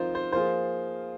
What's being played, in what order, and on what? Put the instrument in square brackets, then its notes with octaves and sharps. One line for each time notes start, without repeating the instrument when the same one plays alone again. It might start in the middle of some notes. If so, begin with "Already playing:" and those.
Already playing: [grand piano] F3 C4 D#4 A#4 [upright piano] F4 C5
[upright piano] C5
[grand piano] F3 A#3 F4 G#4 [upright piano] C5